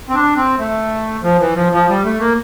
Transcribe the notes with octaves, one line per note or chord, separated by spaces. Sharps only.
C4
D4
C4
A3
F3
E3
F3
F3
G3
A3
A#3